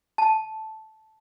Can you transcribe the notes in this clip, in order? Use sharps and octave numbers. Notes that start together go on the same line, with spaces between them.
A5